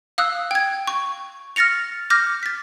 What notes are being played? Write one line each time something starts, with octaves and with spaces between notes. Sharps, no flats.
F5 D#6 E6 F#6
G5 G#6
C#6
F6 A6 A#6 C#7 F7
D6 F6 G6 A#6
A6 B6